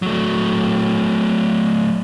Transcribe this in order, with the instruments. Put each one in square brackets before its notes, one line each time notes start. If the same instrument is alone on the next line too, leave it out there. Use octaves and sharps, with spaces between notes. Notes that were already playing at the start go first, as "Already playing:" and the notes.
[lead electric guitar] F#3 A3